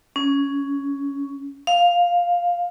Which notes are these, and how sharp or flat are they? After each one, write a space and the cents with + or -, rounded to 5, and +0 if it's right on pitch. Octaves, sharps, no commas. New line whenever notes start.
C#4 +10
F5 +5